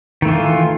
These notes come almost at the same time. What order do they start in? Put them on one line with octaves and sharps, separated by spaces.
D#3 A3 E3 F4